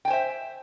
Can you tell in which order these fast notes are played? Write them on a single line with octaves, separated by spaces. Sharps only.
G5 G#5 C5 E5